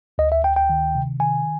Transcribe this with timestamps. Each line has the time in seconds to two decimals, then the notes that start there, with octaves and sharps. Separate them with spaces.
0.18 D2 D#5
0.32 E5
0.44 D2 G5
0.56 G5
0.69 D#3
0.95 C3
1.20 D#3 G#5